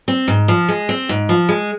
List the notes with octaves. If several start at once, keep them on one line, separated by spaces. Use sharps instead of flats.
C4
G#2
F3
G#3
C4
G#2
F3
G#3